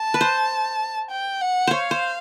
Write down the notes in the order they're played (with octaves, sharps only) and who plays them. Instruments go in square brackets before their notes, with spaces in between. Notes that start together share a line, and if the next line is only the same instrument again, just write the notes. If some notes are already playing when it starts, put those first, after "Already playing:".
Already playing: [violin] A5
[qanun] B4
C5
[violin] G5
F#5
[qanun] C5 C#5 [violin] F5
[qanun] C5